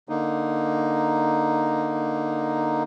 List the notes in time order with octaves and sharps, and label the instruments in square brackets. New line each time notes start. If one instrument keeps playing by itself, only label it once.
[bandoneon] D3 A#3 D#4